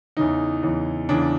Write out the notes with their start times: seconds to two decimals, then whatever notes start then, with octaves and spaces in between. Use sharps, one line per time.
0.17 E2 C#3 E3 D#4
0.63 E2 C#3 E3
1.09 E2 C#3 E3 D4